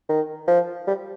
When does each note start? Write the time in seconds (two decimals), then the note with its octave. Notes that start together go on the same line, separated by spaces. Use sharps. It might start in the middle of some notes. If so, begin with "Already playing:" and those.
0.09 D#3
0.48 F3
0.87 G3